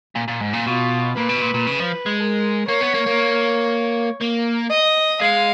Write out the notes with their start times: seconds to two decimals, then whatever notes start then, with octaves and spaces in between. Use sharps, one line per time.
0.16 A#2
0.28 A#2
0.41 G#2
0.53 A#2
0.66 B2 F4
1.16 A#2 B4
1.29 B2
1.42 A#2
1.54 A#2
1.67 C#3
1.80 F3
2.06 G#3
2.18 A#4
2.68 A#3 C#5
2.81 B3
2.94 A#3
3.06 A#3
4.21 A#3
4.70 D#5
5.21 G#3 F5